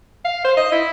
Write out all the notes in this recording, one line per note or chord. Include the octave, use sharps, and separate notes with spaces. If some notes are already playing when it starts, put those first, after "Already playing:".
F5
C5
D#5
E4